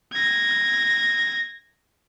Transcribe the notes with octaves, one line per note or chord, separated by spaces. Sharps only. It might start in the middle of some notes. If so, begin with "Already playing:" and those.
G#6 A#6